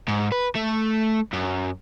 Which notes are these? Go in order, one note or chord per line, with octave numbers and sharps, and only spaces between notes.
G#2
B4
A3
F#2